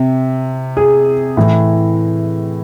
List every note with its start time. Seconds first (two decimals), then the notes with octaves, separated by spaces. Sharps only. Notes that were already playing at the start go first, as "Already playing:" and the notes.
Already playing: C3
0.77 G#4
1.37 A2 E3